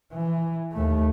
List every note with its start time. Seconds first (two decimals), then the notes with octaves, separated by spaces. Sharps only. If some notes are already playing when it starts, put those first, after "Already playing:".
0.12 E3
0.73 D#2 A3